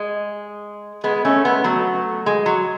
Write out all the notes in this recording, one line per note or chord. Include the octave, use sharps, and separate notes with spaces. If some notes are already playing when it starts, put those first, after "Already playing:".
Already playing: G#3
G#3 B3
A3 C#4
G#3 B3
F#3 A3
G#3
F#3